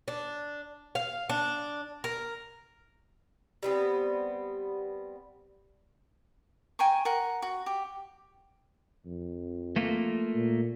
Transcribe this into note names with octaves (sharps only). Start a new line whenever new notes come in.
D4
F5
D4
A#4
G3 B3 C4
G5 G#5 A#5 C#6
A#4 F#5
F#4
G4
F2
A3 A#3 F4
A#2